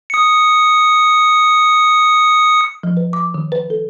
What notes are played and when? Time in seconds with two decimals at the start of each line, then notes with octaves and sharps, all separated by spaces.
0.10 D#6 C#7
2.83 F3
2.97 B4
3.13 D6
3.34 D#3
3.52 B4
3.70 A4